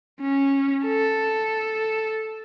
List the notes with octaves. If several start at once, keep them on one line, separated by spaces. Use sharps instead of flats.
C#4
A4